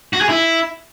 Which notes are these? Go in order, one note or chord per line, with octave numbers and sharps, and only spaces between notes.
F#4
G#4
E4